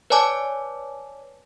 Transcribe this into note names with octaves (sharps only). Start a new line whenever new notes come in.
B4 C#5 D5 G#5 A5 D6